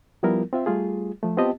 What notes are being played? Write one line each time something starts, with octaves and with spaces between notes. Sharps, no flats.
F3 G3 B3 E4 F4 A#4
C4 F4 E5
G3 A3 F4 G#4
F3 A3
B3 C4 F4 G4 D#5 A5